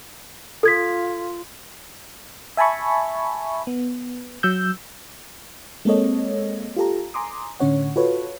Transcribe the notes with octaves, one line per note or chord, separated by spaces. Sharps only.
F4 A4 G#6 B6
E5 G#5 A5 B5 C#6
B3
F#3 E6 G6
G#3 A#3 C4 A4 C#5 D#5
F4 G4 A4 A#5
G#5 A#5 C6 D6 D#6
A2 D3 C#4 C#5 F#5
F4 F#4 A4 B4 C#5